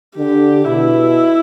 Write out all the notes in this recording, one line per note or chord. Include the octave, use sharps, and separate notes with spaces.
D3 G4
B2 E4